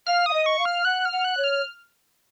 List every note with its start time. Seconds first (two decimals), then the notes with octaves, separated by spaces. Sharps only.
0.07 F5 F6
0.26 F5 D#6
0.33 D#5
0.46 C#6
0.59 F5
0.65 F6
0.85 F#5 F#6
1.05 F6
1.12 F#5
1.24 F#6
1.37 C#5
1.44 F6